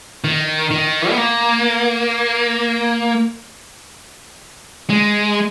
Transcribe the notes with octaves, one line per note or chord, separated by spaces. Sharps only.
D#3
D#3
B3
A#3
G#3